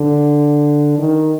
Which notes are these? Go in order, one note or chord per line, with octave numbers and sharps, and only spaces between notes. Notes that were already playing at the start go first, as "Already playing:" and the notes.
Already playing: D3
D#3